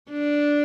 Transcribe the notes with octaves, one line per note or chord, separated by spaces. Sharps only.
D4